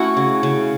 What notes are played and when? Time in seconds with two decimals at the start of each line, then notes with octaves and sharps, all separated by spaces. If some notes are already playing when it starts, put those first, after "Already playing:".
Already playing: A3 C#4 E4 F#4
0.17 C#3
0.43 C#3